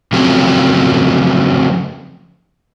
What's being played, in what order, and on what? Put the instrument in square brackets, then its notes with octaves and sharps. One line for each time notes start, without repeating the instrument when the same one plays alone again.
[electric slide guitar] C#3 F3 F#3 A3 C4 G4